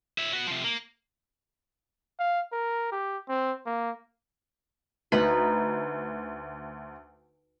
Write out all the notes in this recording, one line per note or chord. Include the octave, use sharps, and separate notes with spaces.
C#5 E5
B3 F#4
C3 F3
A#3
F5
A#4
G4
C4
A#3
D2 D#4 B4